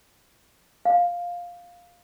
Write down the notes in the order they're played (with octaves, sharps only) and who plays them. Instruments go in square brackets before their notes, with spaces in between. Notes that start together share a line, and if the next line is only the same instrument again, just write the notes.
[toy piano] F5